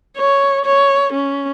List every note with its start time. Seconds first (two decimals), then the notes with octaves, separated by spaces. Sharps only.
0.17 C#5
0.65 C#5
1.12 C#4